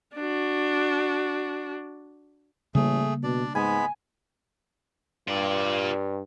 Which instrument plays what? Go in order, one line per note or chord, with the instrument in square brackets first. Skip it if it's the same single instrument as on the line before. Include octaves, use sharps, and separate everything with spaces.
[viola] D4 F#4
[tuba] A1 [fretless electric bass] C#3 G3 A#3 [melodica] A3 G#4
[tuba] B2 [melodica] D4 D5
[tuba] G#2 [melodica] G#3 B3 B5 [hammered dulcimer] G#5
[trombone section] G2 [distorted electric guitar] F4 D5